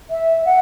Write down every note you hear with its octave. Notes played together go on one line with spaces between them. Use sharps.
E5
F#5